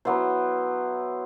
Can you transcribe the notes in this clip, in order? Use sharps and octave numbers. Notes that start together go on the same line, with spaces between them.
F#3 B3 E4 C5